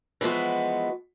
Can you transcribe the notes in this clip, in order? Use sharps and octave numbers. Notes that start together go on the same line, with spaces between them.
E3 F3 G#3 B3 F#4